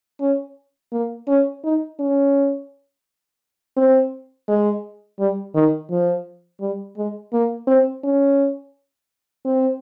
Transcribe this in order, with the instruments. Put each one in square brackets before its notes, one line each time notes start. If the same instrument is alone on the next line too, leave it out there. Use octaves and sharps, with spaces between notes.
[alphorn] C#4
A#3
C#4
D#4
C#4
C4
G#3
G3
D#3
F3
G3
G#3
A#3
C4
C#4
C4